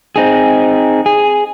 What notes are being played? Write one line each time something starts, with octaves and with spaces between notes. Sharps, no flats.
C4 D#4 G#4
G#4